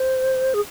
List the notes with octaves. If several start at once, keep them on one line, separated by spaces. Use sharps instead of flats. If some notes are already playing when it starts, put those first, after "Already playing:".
Already playing: C5
G#4